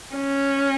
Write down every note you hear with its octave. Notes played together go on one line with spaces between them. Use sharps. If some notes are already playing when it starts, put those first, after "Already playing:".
C#4